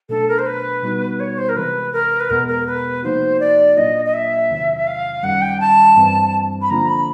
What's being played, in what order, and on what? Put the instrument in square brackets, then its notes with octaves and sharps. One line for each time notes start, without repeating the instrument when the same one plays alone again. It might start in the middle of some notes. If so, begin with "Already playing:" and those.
[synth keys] B2 F#3 A3 D4 [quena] A4
[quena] A#4
C5
B4
[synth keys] B2 G3 B3 D#4 F#4
[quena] C#5
C5
A#4
[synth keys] C3 E3 G#3 [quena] B4
[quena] A#4
B4
[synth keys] E2 B2 G#3 B3 [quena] A#4
[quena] A#4
B4
[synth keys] C3 F3 A#3 D#4 F#4 [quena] C5
[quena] D5
[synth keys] A#2 F#3 A#3 D4 F4 [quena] D#5
[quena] D#5
E5
[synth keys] E2 C3 D#3 F#3
[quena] F5
[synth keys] F#2 D#3 G3 [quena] F#5
[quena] G5
A5
[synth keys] G2 E3 G3 C4
[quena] B5
[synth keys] D3 F3 A#3 D4 F4 [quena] A#5
[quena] B5